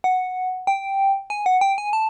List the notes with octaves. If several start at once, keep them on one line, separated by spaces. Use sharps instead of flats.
F#5
G5
G#5
F#5
G5
G#5
A5